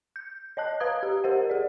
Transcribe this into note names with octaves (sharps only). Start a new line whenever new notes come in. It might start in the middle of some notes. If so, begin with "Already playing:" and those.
G6
C#5 D#5 A5 F#6
B4 F5 A#5 D#6 G#6
G4
G4 A#4 C5 D#5 F#5
G#4 D5